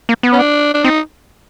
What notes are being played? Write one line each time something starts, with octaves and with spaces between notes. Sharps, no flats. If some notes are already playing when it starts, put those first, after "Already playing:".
A#3
B3
C#4
D4
D4
C4 D#4